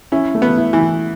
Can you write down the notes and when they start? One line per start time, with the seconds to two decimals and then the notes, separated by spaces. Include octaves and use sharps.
0.12 C#4 E4
0.35 A3
0.42 B3
0.58 E4
0.73 E3
0.81 E4